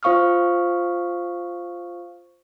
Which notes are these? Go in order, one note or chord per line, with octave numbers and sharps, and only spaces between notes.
F4 C5 F5 C#6 D#6 F6